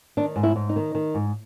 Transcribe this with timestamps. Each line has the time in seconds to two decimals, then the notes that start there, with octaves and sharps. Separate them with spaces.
0.17 D#3 D4
0.36 G#2
0.43 E4
0.56 G#2
0.69 D#4
0.76 D#3
0.95 D#3
1.15 G#2